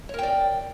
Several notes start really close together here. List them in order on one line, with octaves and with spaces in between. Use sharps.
C#5 A#4 G5 D5